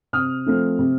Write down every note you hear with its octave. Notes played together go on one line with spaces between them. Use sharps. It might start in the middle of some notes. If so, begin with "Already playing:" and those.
C3 D#6 F6
F3 A3 C4
C3